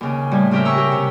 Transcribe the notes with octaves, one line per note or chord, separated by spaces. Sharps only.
D#2 C#3
A2 G3
C#3 C4 G4 A#4 E5
A#5 C#6 E6
G4
C3